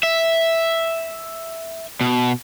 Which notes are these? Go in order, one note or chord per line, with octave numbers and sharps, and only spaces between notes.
E5
B2